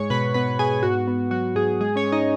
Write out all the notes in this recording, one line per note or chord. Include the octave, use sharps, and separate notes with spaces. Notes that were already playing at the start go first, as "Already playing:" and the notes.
Already playing: G#2 G#3 C#5 C#6
B2 B4 B5
B3 B4 B5
B3 G#4 G#5
G#2 F#4
B3
F#3 F#4
G#2 G#4
G#3 G#4
C#4 C#5
G#3
D#4 D#5